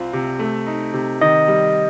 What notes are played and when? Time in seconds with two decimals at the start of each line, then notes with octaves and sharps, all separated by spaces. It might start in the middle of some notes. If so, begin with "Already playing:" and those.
Already playing: C2 C4 F4
0.13 C3
0.39 A3
0.67 D#4
0.94 C3
1.21 D#3 D#5
1.48 G3